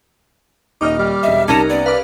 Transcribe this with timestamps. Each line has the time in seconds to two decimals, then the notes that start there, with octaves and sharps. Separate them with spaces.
0.81 D#1 D#4 D#5 D6 F6
0.99 G3
1.23 E1 D#5 E5
1.48 C2 G3 C#4 D#4 A#4 A5
1.70 B3 D5
1.86 B4 F5 D6